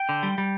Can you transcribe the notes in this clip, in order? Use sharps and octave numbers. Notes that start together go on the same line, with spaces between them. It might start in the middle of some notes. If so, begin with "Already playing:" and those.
Already playing: G5
D3
G3
G3